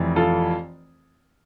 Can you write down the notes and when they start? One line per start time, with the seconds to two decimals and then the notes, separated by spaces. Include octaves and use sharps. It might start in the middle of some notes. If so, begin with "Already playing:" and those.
Already playing: F1 F2 E3
0.16 F4 A4